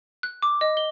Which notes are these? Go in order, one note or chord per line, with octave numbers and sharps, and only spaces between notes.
F#6
D6
D#5
G7